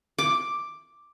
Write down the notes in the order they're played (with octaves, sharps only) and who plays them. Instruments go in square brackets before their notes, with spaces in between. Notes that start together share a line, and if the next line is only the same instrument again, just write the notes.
[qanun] D6